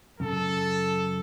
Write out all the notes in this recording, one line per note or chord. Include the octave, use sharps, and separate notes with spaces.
F#2 C#3 A4